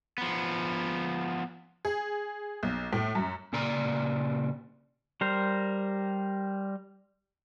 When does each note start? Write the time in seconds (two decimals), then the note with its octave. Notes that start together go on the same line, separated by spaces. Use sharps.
0.18 F3 B3
1.85 G#4
2.63 B1
2.93 A2
3.15 F#2
3.53 A#2 C#3 A#3 D5 A#5
5.21 G3 A#4 C5